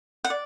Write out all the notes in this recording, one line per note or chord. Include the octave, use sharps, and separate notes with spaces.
F#5
D5